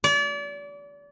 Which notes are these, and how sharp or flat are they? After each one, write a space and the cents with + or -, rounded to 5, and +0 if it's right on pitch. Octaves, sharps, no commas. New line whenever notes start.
D5 -35